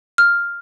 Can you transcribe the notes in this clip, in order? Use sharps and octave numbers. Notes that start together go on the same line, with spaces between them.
F6